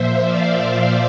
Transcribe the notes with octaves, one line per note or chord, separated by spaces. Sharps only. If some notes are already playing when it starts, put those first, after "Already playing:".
Already playing: A#2 F3 C5 E5
D5 F5